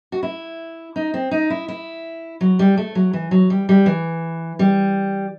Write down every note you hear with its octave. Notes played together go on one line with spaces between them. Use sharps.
F#4
E4
D#4
C4
D#4
E4
E4
F#3
G3
A3
F#3
E3
F#3
G3
G3
E3
G3